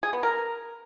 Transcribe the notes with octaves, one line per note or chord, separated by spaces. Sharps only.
G#4
B3
A#4